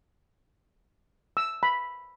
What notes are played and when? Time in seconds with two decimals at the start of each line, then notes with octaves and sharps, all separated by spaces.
1.37 E6
1.63 B5